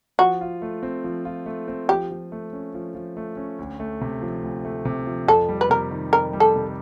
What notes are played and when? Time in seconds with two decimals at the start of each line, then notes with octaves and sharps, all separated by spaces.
0.19 F3 F#4
0.41 F4
0.62 A3
0.83 C4
1.04 F3
1.25 F4
1.46 A3
1.68 C4
1.89 F3 G4
2.11 F3
2.32 A3
2.53 C#4
2.74 F3
2.95 F3
3.17 A3
3.37 C#4
3.59 D2
3.80 A3
4.01 C3
4.22 F3
4.43 D2
4.65 A3
4.85 C3
5.06 F3
5.27 F2 A4
5.49 G3
5.61 B4
5.70 C3 A#4
5.91 D#3
6.13 F2 A#4
6.33 G3
6.40 A4
6.56 C3